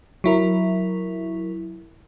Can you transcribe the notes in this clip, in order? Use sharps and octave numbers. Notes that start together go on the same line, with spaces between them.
F#3 E4 A#4